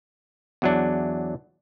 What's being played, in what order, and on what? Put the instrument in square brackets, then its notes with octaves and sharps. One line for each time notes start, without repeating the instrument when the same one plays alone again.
[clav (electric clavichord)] E2 F#3 D4